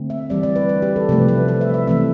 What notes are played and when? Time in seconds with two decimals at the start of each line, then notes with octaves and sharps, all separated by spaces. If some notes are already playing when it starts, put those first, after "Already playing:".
Already playing: D3 A3 C4
0.10 E5
0.30 E3 G3 C4 D5
0.43 D5
0.56 B4
0.69 B4
0.82 G4
0.96 A4
1.09 C3 F3 A3 B4
1.28 B4
1.48 B4
1.61 E5
1.74 E5
1.87 E3 A3 C4 E5